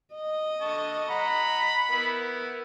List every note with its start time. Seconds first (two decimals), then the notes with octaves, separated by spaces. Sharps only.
0.15 D#5
0.61 D3 A5 C#6
1.10 F#5 A#5 B5
1.91 B3 E4 A#4 F#5